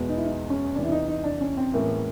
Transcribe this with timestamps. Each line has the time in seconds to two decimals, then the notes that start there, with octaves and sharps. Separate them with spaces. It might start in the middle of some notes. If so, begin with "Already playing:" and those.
Already playing: E2 B2 G#3 B3
0.09 D#4
0.17 E4
0.25 D#4
0.50 C#4
0.75 E2 C3 E3 D4
0.85 E4
0.92 D#4
1.08 D#4
1.24 D4
1.41 C#4
1.57 C4
1.73 A2 E3 G#3 A#3 C#4